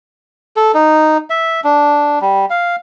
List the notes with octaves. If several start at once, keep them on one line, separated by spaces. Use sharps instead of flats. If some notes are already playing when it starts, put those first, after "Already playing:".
A4
D#4
E5
D4
G3
F5